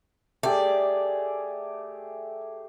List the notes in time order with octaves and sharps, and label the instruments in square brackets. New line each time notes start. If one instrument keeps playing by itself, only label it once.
[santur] A3 G4 G#4 [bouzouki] D5